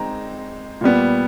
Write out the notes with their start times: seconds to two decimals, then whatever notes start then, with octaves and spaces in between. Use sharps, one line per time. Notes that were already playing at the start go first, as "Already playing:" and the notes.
Already playing: G#3 C4 D#4 A#5
0.81 A#2 G3 B3